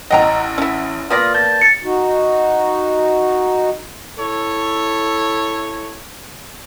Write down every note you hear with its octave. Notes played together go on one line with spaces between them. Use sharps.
A1 D#5 F#5 G5 A#5
C#4 E4
A#3 F4 B4 D5 D#6 A#6
A5 G6
A6 C#7
D#4 F#4
E4 A4 C#5